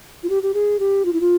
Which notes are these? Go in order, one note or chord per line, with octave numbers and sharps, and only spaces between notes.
F4
G4
G4
G#4
G4
F4
E4
F4